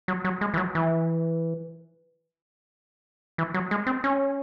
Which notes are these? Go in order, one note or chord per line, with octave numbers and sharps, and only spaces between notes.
F#3
F#3
G#3
E3
F#3
E3
E3
F#3
G#3
C4
C#4